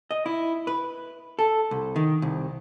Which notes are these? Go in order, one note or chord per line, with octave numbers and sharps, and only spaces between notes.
D#5
E4
B4
A4
C2
D#3
C2